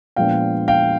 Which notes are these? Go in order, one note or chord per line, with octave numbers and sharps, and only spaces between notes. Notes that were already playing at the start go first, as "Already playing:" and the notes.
A#2 F3 G#3 B3 D4 F5 G5
F5 G5